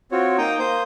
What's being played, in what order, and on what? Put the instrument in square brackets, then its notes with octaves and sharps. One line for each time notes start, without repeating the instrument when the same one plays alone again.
[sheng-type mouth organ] C4 F4 F#4 C#5
A#3 D#4 G5 A#5 D#6
A#3 C5 D#6 G6